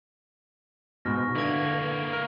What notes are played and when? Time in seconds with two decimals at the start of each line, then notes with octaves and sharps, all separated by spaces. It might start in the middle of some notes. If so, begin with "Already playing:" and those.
1.05 G#2 B2 C#6 F6 A#6
1.35 D3 A#3 E4 B4 G#6
1.80 F5
2.13 A#4